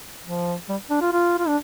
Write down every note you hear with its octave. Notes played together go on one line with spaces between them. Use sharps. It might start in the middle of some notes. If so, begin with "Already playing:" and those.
F3
G3
D4
F4
F4
F4
D4